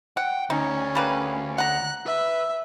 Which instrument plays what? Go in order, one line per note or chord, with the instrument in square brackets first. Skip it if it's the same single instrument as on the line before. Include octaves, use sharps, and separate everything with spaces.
[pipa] F#5 [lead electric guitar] G5
[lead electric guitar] D2 [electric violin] C#4 [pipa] D#4
[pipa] G3 A#3 B4
[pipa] F#5 A#5 [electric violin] F#6
[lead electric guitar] B4 [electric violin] E5